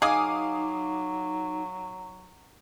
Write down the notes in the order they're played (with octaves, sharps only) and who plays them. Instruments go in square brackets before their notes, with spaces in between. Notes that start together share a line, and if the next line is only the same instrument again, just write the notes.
[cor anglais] F#3 [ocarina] D#4 [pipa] G#4 D#5 G#5 [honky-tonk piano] F5 D6 D#6